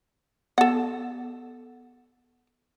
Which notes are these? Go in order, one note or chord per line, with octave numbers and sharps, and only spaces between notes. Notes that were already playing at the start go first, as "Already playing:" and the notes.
B3 A4 F#5